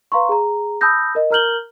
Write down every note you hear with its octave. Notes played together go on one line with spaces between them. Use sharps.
B4 F5 A#5 C6 C#6
G#4 A#5
A5 B5 D#6 E6 G6 A#6
A#4 D#5
A#4 A#5 F6 G6 F#7 G7